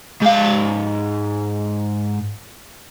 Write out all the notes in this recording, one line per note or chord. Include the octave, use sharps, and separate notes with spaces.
G#2 F5